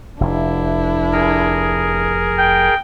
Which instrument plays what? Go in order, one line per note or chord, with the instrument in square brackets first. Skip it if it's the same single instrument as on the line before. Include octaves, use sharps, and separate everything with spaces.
[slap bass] F1 [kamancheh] D4 E4
[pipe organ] G#4 A#4
[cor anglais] G5